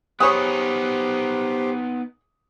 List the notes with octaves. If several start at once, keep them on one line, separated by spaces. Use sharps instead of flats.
B3 D#4 G4 G#4 C5 C#5 B5 D#6